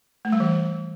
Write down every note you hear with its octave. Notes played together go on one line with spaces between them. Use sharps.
A3
G3
E3